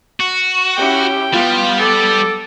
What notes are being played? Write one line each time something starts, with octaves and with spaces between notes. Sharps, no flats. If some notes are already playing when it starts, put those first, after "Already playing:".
F#4
C#4 E4 G4 G5
G3 B3 F4
A4 D6